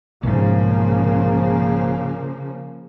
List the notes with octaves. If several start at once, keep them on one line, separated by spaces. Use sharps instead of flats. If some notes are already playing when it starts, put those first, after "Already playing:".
B1 G#2 C#3 F3 A#3